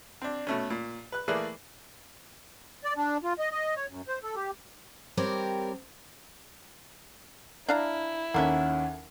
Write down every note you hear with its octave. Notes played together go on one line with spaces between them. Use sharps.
C4 D4
B2 A3 C#4
A#2
B4 F#6
E3 A3 A#3 G#4 B4 D5
D5
D4
F4
D#5
D#5
C#5
F#2
C5
A4
G4
G3 C4 G4 A#4 C#5 D5
D4 E4 F5 A#5
D#2 A#3 C#4 A4 E5 F#5